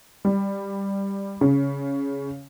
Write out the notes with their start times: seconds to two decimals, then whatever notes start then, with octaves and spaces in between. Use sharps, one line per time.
0.25 G3
1.41 C#3